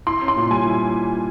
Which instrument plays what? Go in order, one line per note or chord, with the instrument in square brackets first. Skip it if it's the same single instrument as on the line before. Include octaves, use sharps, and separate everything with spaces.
[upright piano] E4 [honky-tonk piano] C6
[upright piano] C#4
[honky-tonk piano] C6
[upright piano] A#2
[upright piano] G3 [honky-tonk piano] G#5
[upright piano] E4